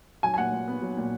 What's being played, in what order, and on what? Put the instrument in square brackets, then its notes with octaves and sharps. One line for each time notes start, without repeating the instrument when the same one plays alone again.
[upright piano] F#3 G#5
G#5
A#2 F#5
A#2
B3
F#3
A#2